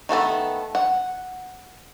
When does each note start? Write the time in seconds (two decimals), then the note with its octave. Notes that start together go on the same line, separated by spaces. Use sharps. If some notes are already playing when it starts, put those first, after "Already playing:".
0.09 D#3 A3 B3 A4
0.75 F#5